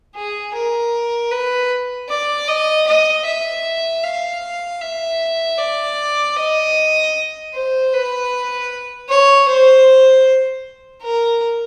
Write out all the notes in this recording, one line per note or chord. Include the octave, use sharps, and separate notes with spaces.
G#4
A#4
B4
D5
D#5
D#5
E5
F5
E5
D5
D#5
C5
B4
C#5
C5
A#4